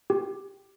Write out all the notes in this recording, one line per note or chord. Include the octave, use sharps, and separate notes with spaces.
G4